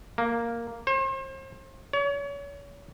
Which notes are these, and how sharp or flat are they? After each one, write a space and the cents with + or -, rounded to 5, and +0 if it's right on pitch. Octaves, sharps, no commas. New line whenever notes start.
A#3 +0
C5 +40
C#5 +35